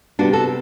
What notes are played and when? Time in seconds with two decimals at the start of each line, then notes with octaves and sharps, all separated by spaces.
0.19 C3 G3 B3 D4 F#4
0.33 F#4 A4